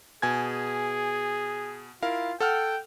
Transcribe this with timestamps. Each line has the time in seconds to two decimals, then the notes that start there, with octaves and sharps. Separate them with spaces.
0.22 B2 G#4 G#5 G#6
2.03 E4 F4 A#4 F5
2.40 A4 F#5 G5 F6